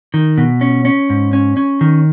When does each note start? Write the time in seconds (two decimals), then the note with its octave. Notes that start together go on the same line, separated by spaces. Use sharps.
0.14 D#3
0.38 B2
0.61 C#4
0.85 C#4
1.10 G#2
1.33 C#4
1.57 C#4
1.81 D#3